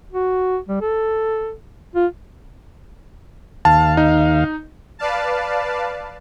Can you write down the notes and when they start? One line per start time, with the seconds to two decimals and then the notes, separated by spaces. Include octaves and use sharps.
0.13 F#4
0.69 G3
0.81 A4
1.96 F4
3.65 D#2 F5 A5
3.97 D#4
4.99 B4 D5 F5 A5